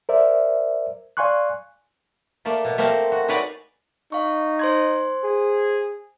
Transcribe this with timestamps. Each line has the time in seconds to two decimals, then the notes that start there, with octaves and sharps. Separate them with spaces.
0.09 A#4 C5 D5 E5
1.17 D5 F5 G#5 C6 C#6 F#6
2.45 A3 A#3 D5
2.65 B2
2.78 A3 A#3 C4 A#4 C5
3.12 F#4
3.28 D#4 F#4 G#4 B4 C#5 D5
4.12 D#4 F5 C#6
4.59 C5 C6 G#6
5.24 G#4